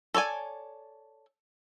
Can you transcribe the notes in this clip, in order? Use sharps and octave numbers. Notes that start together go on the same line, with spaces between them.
A4 C#5 D5 G#5